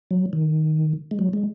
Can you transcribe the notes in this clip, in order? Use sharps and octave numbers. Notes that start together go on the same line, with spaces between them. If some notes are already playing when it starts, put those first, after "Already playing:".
F#3
D#3
G#3
F#3
G#3